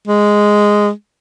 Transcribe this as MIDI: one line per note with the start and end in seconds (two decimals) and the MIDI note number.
0.07 0.90 56